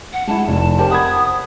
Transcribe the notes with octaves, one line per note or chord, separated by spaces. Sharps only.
F#5
G#3 E4 A5
F1
G4 A#4 C5 A5
F#5 B5 D#6 G#6